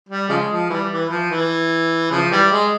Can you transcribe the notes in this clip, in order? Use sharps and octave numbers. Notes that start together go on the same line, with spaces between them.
G3
C#3 F3 G#3
F3
E3 G3
E3
F3
E3
C#3 F3
E3 G3
G#3